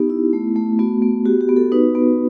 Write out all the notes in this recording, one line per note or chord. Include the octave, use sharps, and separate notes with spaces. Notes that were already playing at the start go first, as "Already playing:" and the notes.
Already playing: B3 D#4 G4
E4
A3
A3
B3 F#4
B3
F#4 G4
G4
B3
A4
D#4 B4
B3